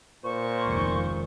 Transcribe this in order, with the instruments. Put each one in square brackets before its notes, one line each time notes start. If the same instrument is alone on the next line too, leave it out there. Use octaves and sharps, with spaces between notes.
[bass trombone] A#2 [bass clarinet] C5 [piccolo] C#6
[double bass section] F1 C#2 D#3